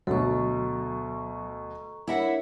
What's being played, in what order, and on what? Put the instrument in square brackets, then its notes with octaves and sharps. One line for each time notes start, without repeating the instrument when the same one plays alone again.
[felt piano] D2 B2 [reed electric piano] F#3 [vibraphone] A4 A#5 C#6
[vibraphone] D4 A#4 C#5 [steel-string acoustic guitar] E4 E5 F#5